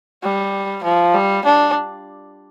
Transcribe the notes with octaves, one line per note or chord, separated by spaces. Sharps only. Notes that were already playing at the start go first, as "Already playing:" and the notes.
G3
F3
G3
D4